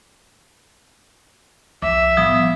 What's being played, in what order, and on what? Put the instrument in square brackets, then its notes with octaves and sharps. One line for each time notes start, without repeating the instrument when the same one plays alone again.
[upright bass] C2 F3 [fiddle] E5 [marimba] D6
[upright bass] A2 [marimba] F3 G3 B3 [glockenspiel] D#6